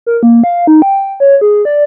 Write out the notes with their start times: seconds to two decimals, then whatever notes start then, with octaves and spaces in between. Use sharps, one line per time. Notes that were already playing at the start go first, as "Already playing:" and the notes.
0.06 A#4
0.23 A#3
0.44 F5
0.67 D#4
0.82 G5
1.20 C#5
1.41 G#4
1.65 D5